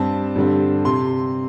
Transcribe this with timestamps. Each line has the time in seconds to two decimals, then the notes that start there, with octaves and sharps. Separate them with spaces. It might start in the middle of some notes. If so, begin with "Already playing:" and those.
Already playing: G2 G3 C4 A5
0.36 G2 D3 G3 C4
0.85 C3 C6